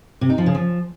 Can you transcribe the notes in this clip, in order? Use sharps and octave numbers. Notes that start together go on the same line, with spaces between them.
C3
D#4
F3
C#3
F3